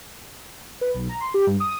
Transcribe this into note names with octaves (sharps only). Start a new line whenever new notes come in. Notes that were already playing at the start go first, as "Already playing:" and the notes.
B4
B1
A#5
C6
G4
G2
D#6